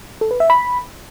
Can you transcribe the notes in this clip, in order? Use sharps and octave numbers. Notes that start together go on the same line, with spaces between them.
A4
B4
E5
B5